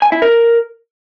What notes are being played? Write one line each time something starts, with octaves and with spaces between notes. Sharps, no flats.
G#5
E4
A#4